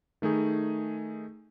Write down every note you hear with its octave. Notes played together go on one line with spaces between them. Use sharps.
D#3 A3 D#4 G#4